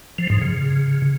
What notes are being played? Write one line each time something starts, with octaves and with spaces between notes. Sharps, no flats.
F3
G#2
C#3